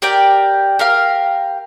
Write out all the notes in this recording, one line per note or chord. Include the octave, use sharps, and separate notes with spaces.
G4 A#4 D5 G5
G4 A#4 F5